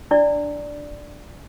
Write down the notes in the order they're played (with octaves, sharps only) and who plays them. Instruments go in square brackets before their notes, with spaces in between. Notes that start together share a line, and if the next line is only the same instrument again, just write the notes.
[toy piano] D4 E4 D5